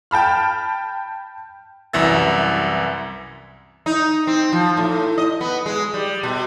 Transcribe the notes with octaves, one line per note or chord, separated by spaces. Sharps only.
G5 A5 B5 F6
C2 F#2 E3 E5 E6 A6
D#4
C4
F3
A2
D#5
B3
G#3
G3
B2